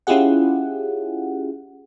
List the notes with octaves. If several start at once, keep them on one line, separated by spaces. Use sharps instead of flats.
C#4 E4 F4 G4 G#4 F#5